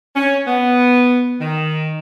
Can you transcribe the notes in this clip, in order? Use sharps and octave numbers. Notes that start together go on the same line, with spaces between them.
C#4
B3
D#3